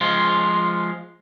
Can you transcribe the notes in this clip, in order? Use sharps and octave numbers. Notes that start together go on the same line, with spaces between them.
F3 G#3 F4